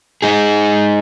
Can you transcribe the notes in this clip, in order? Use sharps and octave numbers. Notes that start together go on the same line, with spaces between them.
G#3 D#4 G#4